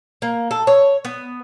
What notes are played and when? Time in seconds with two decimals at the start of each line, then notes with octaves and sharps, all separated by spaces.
0.22 A#3
0.51 A4
0.67 C#5
1.05 B3